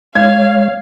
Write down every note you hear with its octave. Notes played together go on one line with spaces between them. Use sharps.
G#3 C#5 F5 G#6